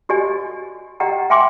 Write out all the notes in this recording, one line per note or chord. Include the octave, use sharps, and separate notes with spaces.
F#4 G4 D5 D#5 G#5
G4 D5 D#5 F#5 G5 A#5
E5 G5 G#5 C6 D6